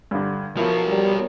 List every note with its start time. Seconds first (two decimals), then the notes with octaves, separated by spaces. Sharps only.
0.11 G2 D3
0.57 F3 F#3 B3 E4 A#4
0.88 G3